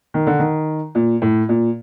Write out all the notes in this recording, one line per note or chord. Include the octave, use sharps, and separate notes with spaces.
D#3
D3
D#3
A#2
A2
A#2